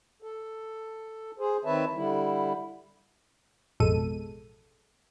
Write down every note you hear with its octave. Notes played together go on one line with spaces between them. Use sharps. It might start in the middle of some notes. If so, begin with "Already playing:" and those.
A4
G#4 C5
D#3 C4 B4 C#5 E5 A5
D3 G3 E4
A1 F2 B2 G#3 A4 D#7